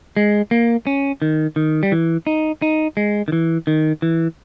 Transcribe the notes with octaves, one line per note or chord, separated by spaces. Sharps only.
G#3
A#3
C#4
D#3
D#3
G3
E3
D#4
D#4
G#3
D#3
E3
D#3
E3